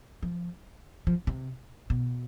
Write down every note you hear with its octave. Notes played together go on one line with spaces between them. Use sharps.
F3
F3
C3
B2